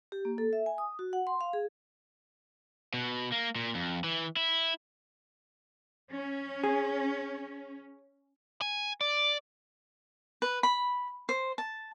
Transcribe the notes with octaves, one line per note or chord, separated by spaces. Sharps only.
G4
A#3
A4
E5
G#5
D#6
F#4
F#5
C6
F5
G#4
B2
A#3
A#2
F2
E3
E4
C#4
G#4
G#5
D5
B4
B5
C5
A5